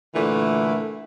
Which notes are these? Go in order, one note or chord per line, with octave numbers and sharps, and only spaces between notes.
A#2 D3 E3 A3